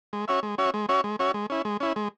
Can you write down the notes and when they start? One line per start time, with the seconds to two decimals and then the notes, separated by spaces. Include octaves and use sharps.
0.13 G#3
0.28 C#4 F#4 C#5 E5
0.43 G#3
0.58 C#4 F#4 C#5 E5
0.74 G#3
0.89 C#4 F#4 C#5 E5
1.04 G#3
1.19 C#4 F#4 C#5 E5
1.34 G#3
1.50 C#4 E4
1.65 G#3
1.80 C#4 E4
1.96 G#3